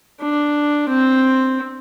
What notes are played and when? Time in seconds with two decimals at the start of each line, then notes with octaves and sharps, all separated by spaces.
0.21 D4
0.89 C4